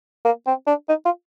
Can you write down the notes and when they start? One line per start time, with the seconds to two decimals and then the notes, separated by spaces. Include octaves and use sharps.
0.25 A#3
0.47 C4
0.67 D4
0.89 D#4
1.05 F4